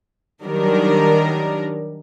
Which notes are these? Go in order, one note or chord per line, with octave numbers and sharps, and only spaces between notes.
D#3 F#3 G3 D4 D#4 A#4